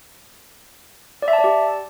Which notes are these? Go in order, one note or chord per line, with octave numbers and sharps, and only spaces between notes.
D5
E5
A5
D5
G4